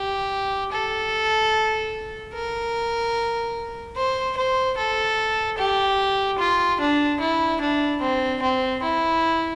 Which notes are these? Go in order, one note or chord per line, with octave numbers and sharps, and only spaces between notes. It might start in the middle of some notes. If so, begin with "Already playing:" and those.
Already playing: G4
A4
A#4
C5
C5
A4
G4
F4
D4
E4
D4
C4
C4
E4